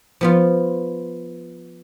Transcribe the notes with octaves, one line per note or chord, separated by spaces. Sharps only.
F3 B3 F4